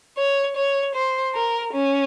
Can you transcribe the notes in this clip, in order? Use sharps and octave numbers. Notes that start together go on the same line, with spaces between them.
C#5
C#5
C5
A#4
C#4